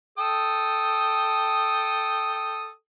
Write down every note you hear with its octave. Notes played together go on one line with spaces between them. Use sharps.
A4 G5 D#6